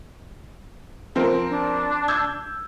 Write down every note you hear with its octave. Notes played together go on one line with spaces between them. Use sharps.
F3 C4 A#4
D4
E6 G6 G#6